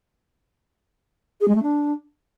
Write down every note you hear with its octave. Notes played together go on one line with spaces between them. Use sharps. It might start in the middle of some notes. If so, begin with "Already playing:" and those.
G#4
G#3
A3
D4